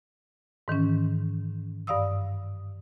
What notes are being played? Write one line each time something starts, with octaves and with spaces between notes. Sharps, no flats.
G#2 D#3 E3 C#4
G2 D5 F5 D#6 E6